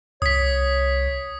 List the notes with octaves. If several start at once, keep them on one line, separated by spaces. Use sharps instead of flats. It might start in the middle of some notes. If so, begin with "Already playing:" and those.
C2 C#5 D#6 B6